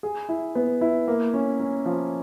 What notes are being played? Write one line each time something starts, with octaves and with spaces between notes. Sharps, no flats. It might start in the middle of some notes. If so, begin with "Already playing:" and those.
G#4
E4
B3
E4
A#3
C#4
C#4
F3